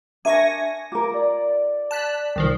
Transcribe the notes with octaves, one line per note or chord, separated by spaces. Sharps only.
D4 A#4 E5 G#5 C#6 A#6
F4 A#4 D6
D5
A5 F#6 B6
C2 D#3 F3